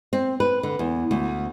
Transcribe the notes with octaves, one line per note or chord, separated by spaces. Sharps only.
C4
B4
D3
E2
D2